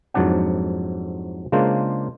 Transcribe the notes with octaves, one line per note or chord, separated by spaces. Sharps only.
F2 G#2 F#3 D4 D5 F#5
C#3 G#3 A#3 D4 F4 C5